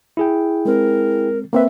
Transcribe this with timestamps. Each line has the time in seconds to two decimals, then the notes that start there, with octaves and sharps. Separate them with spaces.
0.17 E4 G#4 G5
0.65 G#3 C4 A#4
1.53 A#3 C4 B4 E5